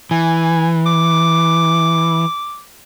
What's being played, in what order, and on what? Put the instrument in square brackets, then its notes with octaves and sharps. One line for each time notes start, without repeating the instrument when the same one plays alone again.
[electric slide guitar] E3 [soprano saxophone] G#5
[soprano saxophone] D6